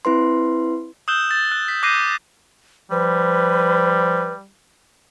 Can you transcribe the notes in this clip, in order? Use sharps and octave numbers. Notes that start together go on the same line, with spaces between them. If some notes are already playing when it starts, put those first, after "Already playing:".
C4 E4 B4 C6
D#6 E6 F#6 G6 E7 G7
A6
F#6
B6
D6 F#6 G6 A#6 C7 D#7
F3 G3 B4